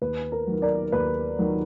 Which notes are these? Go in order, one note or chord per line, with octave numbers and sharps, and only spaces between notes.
D#2 B4
A#4
D#3 F#3
A#4 D5
D#2 B4
D#3 F#3